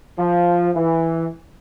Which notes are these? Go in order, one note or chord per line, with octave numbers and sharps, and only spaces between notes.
F3
E3